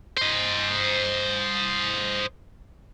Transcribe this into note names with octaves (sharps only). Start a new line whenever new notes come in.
C5 D#5